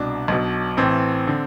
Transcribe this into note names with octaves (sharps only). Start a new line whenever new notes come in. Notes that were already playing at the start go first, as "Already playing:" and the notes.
Already playing: C2 B2 D4
B1 B2
A1 A2 E3 C4
D3